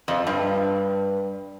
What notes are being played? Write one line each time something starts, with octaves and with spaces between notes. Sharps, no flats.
F2
G2